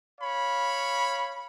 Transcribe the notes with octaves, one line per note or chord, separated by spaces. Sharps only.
C#5 F5 B5